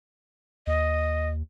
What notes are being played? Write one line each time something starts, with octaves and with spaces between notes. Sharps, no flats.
D#2 D#5